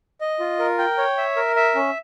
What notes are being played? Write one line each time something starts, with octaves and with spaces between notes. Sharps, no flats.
D#5
F4
A#4
G5
C#5
E5
A#4
E5
C#4